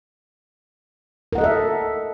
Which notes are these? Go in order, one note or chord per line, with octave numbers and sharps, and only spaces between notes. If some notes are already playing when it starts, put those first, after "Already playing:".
A4 A#4 D#5 E5 F#5